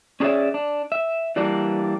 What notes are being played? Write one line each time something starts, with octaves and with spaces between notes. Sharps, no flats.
C#4 D4 G#4 C#5 D5 E5
D4
E5
E3 G3 A#3 D4